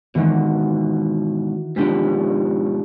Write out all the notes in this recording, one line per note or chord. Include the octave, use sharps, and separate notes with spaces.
G#2 B2 D#3 E3 F#4
G#2 B2 F3 D4 G4 B6